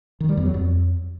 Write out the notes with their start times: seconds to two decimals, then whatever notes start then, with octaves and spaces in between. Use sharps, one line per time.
0.20 D#3
0.29 G3
0.37 E2
0.46 F#3
0.54 F2